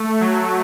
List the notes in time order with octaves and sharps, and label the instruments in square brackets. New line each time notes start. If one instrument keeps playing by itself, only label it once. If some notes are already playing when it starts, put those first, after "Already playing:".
Already playing: [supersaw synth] A3
F#3